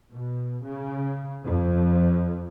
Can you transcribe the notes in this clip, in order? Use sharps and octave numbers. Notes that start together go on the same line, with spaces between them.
B2
C#3
F2